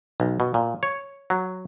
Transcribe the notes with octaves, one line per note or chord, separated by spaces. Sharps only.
B1
B2
A#2
C#5
F#3